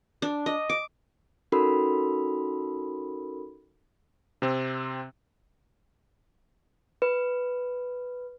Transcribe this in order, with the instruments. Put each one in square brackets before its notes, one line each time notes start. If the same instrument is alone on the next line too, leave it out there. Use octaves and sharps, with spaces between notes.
[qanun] D4
D#5
D6
[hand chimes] C#4 D#4 F#4 A4 A#4 B5
[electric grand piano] C3 C4
[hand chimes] B4